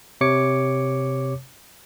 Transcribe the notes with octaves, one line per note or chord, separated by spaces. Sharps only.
C3 C#5 D6 C#7